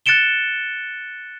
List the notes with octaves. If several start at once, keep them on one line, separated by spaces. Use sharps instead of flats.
F#6 A6 C#7 D7 E7 G7